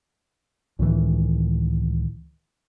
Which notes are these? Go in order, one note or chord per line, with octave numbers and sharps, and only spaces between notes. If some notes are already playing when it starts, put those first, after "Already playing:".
C#2 A2 D#3 E3